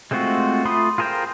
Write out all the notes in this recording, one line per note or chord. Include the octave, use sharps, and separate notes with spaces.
G#3 A3 C4 F4 F#4
A3 F4 B5 C6 D#6
F4 G#4 A#4 C5 G5